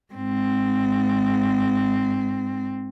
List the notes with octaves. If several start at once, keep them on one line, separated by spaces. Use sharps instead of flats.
G#2 C4